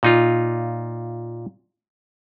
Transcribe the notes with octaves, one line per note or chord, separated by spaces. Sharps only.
A#2 D#4 F4